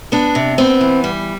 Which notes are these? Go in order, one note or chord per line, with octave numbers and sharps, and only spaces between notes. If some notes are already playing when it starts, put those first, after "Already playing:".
B3 D4
C3
B3 C4
E3
G3